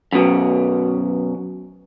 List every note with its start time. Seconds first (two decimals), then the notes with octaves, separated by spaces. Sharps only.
0.13 F#2 B2